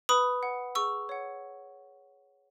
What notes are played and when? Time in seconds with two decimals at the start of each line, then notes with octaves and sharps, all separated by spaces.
0.09 B4 B5 D#6
0.43 F#5
0.75 G#4 C#6 E6
1.09 C#5 F#5